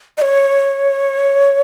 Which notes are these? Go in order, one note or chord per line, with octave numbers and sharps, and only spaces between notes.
D#5
C#5